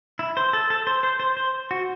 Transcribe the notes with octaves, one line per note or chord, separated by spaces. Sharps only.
E4
C5
A4
A4
C5
C5
C5
C5
F#4